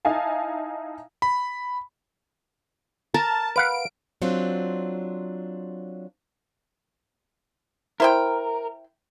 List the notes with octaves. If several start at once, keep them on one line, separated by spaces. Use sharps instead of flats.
D#4 E4 F5 G#5 A5
B5
A#4 A5
B4 F5 F#5 D7
F#3 C4 D4 F4
E4 A#4 C5 G5